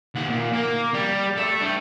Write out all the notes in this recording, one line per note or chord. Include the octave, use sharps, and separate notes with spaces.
D#2 F#5
A#2
A#3
G3
A4 E5
D4 G5